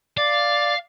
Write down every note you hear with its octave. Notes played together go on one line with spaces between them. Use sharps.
D5 F5